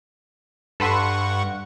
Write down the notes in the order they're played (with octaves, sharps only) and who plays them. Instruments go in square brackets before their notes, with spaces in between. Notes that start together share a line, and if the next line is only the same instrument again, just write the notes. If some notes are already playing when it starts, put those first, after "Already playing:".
[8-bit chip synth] G2 F#5 C#6 [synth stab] A4 B4 C6